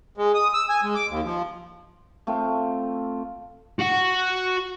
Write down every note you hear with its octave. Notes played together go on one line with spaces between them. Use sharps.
G#3
D#6
E6
G#5
G#3
D6
D#2
F3
A3 C4 F4
F#4 F#5